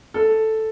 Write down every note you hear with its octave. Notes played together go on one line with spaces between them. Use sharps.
A4